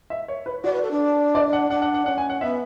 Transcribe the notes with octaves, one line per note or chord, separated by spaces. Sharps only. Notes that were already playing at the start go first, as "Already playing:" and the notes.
E5
C#5
B4
F#4 D5
B4
A4
D4
D5
F#5
D4 F#5
F#5
F#5
C#4 F#5
G#5
F#5
B3 E5